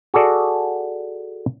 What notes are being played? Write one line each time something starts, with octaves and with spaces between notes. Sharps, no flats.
F#4 G#4 A4 D5